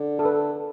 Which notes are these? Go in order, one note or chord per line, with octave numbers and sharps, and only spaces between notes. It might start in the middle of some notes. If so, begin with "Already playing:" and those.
Already playing: D3
A4
B4